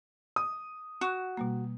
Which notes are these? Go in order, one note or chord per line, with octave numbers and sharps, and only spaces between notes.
D#6
F#4 F#5 C#6 F#6
B2 G3 A#3